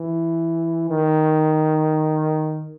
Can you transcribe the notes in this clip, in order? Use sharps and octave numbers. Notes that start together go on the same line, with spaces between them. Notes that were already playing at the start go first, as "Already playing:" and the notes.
Already playing: E3
D#3